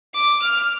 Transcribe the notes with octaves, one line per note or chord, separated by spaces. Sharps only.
D6
F6